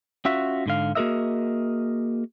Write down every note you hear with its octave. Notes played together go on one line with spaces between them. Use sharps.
C#4 F4 F#4 E5
G#2 D3 F5
A#3 F#4 G#4 A#4 D#5 E5